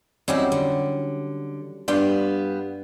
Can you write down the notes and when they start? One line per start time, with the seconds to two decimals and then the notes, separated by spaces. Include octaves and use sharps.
0.28 F#3 G3 C4 C#4 D#4 E4
0.52 D3
1.88 G2 G3 B3 F4 G5 C6